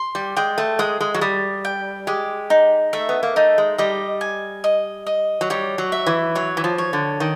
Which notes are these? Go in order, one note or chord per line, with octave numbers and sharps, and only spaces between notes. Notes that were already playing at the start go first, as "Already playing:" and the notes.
Already playing: C6
G3
G#3 G5
A3
G#3 D#6
G#3
F#3
G3 D#6
G5
G#3 G4
D#4
A3 E5
B3
A#3
A3 D#4
G#3
G3 D#5
G#5
D#5
D#5
F#3
G3 C#5
F#3
E5
E3
F#3 C#5
E3
F3
C#5
D3
D#3